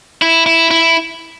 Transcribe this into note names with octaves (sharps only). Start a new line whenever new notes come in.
E4
E4
E4